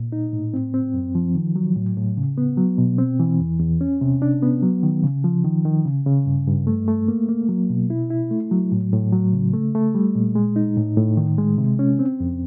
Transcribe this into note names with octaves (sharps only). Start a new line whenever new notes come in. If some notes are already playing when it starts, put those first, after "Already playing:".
Already playing: A#2
D#4
A2
C4
C4
F#2
F3
D#3
F#3
A2
A2
C#3
B3
F#3
B2
C4
E3
E2
E2
C#4
C3
D4
B3
F#3
D#3
C#3
F3
D#3
D#3
C#3
C#3
G2
G2
A3
A3
A#3
A#3
F#3
B2
E4
E4
A3
F#3
A2
A2
F#3
C#3
A3
A3
G3
A#2
G#3
D#4
A2
A2
D#3
G#3
C3
C#4
C4
F2